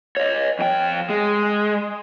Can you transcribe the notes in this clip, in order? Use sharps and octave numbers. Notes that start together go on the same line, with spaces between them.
C#5 D#5
F2 G5
G#3